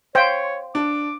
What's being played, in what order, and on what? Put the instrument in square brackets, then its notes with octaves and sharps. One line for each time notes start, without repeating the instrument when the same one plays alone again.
[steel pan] C5 G5 [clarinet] C#5 [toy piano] F5 C6
[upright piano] D4 [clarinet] D6